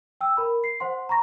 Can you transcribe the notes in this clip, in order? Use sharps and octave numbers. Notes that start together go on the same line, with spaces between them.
G5 E6
A#4 B5
C7
C5 F#5 C6
A#5 B5 C#6 A#6